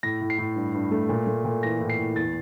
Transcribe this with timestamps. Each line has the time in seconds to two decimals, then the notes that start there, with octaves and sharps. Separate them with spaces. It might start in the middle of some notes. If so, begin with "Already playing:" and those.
0.03 A2 A#6
0.21 A2
0.30 C7
0.38 A2
0.56 G2
0.74 G2
0.91 A3
1.09 A#2
1.27 A3
1.45 A#2
1.63 E3 A#6
1.80 A2
1.90 C7
1.98 A2
2.16 E2 A6